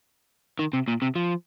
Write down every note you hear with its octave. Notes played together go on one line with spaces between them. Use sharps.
D#3
C3
A#2
C3
F3